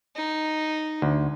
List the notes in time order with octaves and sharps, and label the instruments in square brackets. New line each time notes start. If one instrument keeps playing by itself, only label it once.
[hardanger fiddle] D#4
[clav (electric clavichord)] D2